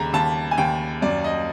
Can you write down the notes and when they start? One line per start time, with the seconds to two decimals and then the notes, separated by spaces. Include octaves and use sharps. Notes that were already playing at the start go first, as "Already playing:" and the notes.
Already playing: D#2 C#3 A#5 B5
0.13 D#2 A5
0.51 G#5
0.58 D#2 G5
1.02 F#2 D5
1.24 D#5